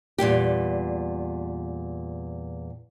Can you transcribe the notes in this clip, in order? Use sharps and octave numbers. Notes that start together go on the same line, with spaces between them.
E2 A#2 G3 G4